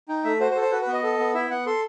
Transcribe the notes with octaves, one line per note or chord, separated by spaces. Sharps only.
D#4 G5
A3 E5
F#4 C5
C5
A4
C5
F#4 B4
B4
B3
D#5
A4
B3
E4 E5
B3 F#5
A4 C6